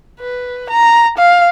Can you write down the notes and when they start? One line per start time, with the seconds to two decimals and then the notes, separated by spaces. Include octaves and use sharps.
0.20 B4
0.70 A#5
1.18 F5